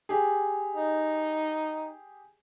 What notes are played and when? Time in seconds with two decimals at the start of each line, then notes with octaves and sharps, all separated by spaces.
0.09 G4 G#4
0.75 D#4